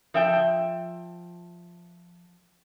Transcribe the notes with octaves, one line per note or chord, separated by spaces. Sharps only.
F3 E5 G5